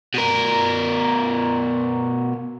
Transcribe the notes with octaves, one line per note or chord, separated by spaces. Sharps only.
B2 A#4